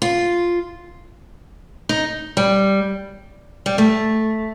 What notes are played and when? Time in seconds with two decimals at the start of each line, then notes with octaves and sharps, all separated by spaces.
0.02 F4
1.89 D#4
2.37 G3
3.66 G3
3.78 A3